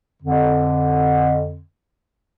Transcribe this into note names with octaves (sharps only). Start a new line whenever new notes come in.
F2 D3